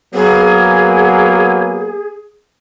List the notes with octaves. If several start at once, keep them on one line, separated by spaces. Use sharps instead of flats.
F#3 A#3 B3 G#4